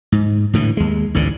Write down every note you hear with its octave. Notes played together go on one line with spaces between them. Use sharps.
G#2
A2 D3 E3
D#2 G#3
A1 D2 G#2 D3